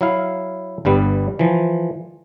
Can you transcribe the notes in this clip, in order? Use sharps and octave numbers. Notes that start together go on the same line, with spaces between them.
F#3 E4 F5
G1 G2 G3 B3
E3 F3